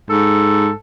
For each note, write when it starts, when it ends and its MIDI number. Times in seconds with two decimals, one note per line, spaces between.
0.10 0.71 44
0.10 0.72 69